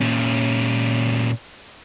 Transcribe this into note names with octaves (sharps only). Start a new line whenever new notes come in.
A#2 C#4